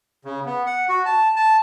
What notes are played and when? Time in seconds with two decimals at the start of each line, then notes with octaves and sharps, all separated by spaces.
0.25 C#3
0.46 B3
0.66 F#5
0.89 F#4
1.05 A5
1.36 A5